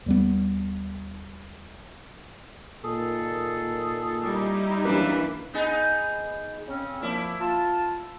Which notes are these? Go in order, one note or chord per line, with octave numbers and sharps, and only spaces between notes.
D#2 G3 B3
A#2 D#3 G#4 A4
G3 D#4 E4
F#2 E3 A#3 D4 B4
B3 D#4 G#4
C#3 C4 C#4
A#2 F3 A#3 E4
F4 A5